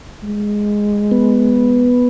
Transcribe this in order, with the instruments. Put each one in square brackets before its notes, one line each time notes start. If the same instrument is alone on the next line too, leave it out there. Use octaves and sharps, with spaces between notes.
[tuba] G#3
[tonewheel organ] B3